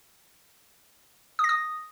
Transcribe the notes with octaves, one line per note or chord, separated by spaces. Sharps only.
D#6
A#6
D#6